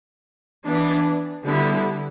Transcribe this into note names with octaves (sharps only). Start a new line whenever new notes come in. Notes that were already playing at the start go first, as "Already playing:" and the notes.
E3 B3 D4
D3 G3 B3 E4